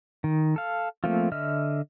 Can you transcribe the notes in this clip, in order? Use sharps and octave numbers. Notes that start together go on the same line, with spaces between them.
D#3
A4 F5
F3 A3 A#3 C4 F4
D3 D#5 E5 F6